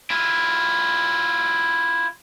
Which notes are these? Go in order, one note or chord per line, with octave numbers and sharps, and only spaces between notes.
E4 F4